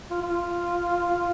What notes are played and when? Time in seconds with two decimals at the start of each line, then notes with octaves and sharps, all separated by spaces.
0.11 F4
0.22 F4